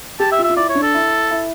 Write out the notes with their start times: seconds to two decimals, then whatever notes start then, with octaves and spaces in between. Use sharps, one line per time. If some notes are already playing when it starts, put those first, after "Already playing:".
0.20 G4 A5
0.32 E5
0.38 F4
0.44 E5
0.50 F4
0.56 E4 D5
0.69 C#5
0.75 D4
0.82 A4
0.94 E4
1.31 E4